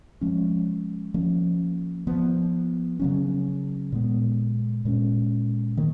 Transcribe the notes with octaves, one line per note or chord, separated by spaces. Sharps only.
F3 G#3 C#4
F3 A#3 C#4
F3 B3
C#3 F#3 C#4
A#2 G#3 B3
A#2 G#3 C#4
D#3 A#3